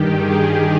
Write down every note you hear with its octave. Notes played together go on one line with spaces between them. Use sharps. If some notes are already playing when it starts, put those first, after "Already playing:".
Already playing: G2 D#3 G4
G#4